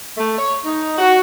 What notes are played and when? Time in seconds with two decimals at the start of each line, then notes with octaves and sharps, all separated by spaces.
0.18 A3
0.38 C#5
0.65 D#4
0.98 F#4